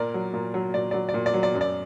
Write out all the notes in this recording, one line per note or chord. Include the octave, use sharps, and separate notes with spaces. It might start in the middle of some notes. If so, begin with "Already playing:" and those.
Already playing: A#2 A#4 D5
F#3
A#2
F#3
A#2 D5
F#3 D5
D5
A#2
D5
F#3
D5
F#2
D5